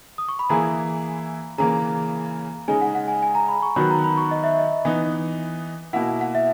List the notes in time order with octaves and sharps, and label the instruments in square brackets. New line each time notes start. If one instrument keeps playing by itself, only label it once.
[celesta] D#6
C#6
B5
[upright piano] E3 A#3 E4 G#4 [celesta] A#5
[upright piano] C#3 E3 A#3 [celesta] A#5
[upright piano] C#3 G#3 D#4 [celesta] G#5
[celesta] F#5
F#5
G#5
G#5
A#5
B5
C#6
[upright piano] D#3 F#3 B3 F#4 [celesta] B5
[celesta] A#5
B5
C#6
D#5
E5
D#5
[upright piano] E3 B3 D#4
[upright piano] B2 A#3 E4 [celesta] F#5
[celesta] F#5
E5